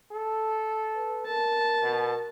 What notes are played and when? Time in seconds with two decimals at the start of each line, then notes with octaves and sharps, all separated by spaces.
0.12 A4
0.96 B4
1.27 A#4 A5
1.82 B2